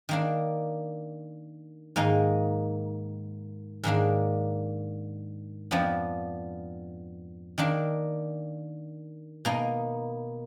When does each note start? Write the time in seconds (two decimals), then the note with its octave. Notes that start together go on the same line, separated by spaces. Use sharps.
0.09 D#3 A#3 D4
1.96 G#2 D#3 A#3 D#4
3.83 G#2 D#3 A#3 D4
5.71 F2 F3 B3 D4
7.58 D#3 A#3 D4
9.45 B2 A#3 D#4